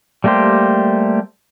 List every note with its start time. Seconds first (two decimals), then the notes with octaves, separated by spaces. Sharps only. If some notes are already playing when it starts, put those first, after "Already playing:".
0.24 G3 A3 A#3 G4 C5